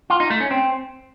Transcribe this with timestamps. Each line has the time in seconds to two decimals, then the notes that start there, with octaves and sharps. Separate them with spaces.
0.10 F4
0.20 D#4
0.30 A3
0.40 C#4
0.51 C4